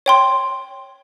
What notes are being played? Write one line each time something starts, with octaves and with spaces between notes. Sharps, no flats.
C#5 G5 C6